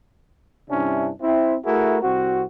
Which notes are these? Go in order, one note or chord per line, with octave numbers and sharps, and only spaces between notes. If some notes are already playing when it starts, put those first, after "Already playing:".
G2 C3 C#4 D4 E4
C4 E4
A3 E4 F#4 G#4 A#4
C2 C4 F#4